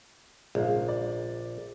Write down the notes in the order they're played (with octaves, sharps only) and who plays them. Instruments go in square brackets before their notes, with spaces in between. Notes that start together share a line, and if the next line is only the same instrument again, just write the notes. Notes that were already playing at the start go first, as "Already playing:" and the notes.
[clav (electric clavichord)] A#1 [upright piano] G#2 C#3 F5
[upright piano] D5